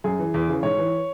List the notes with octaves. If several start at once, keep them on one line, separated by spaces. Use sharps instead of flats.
F#2 G#4
E3
E2
C#3 E3
G#2 C#5
E3